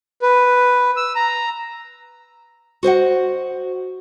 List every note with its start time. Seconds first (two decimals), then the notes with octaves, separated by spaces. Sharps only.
0.22 B4
0.97 E6
1.16 A#5
2.83 F#4 C5 D#5 F#5